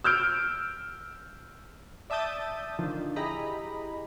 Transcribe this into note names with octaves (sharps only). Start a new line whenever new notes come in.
E6 F6 G6 D7
D5 E5 A5 D#6 G6 A6
D3 D#3 F3 D4
E4 G4 G#4 D#5 A#5 B5